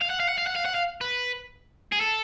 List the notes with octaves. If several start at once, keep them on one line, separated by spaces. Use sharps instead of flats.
F5
F#5
F5
F#5
F5
F#5
F5
F#5
F5
B4
G#4
A4